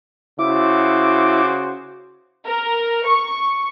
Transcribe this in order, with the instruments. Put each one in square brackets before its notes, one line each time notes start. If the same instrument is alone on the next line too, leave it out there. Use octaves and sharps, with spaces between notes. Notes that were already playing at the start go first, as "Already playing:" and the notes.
[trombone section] C#3 F#4 C5 [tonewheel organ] E4 [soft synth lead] D6
[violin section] A#4
C#6